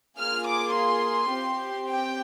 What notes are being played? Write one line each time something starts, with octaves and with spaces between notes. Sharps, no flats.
A#3 F4 G#4 F6
D6
C6
C4 G4
G5